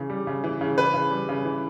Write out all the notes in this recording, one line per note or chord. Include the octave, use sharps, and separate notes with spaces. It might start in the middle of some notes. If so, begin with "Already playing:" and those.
Already playing: C#3 E3
G3
C#3
E3
C#3
E3 B4
C#3
G3
C#3
E3